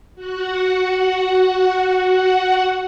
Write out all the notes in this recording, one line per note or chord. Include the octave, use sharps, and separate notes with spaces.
F#4 F#5